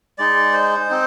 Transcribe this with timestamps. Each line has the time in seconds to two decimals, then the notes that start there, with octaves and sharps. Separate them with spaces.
0.18 G#3 D#4 D5
0.53 C5
0.89 C4 D#4